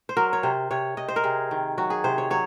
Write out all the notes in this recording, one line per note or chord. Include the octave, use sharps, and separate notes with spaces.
C5
F#3 A#4
C#5
C3 C5
C3 C#5
C3 D#5
C5
A#4
C3 G#4
D#3
F#3 F#4
G#4
C3 C5
C#5
F#3 C#5